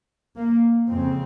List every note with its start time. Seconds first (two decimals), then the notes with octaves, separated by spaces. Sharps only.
0.37 A#3
0.89 F2 C#3 C4